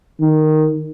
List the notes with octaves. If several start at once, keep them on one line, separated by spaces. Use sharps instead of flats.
D#3